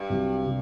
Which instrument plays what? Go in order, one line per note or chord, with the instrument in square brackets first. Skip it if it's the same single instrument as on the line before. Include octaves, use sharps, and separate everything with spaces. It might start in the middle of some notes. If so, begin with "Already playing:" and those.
Already playing: [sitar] G2
[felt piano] C2 C3 F#3
C3